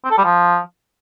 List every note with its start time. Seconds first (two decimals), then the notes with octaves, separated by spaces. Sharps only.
0.04 C4
0.11 A4
0.18 G3
0.24 F3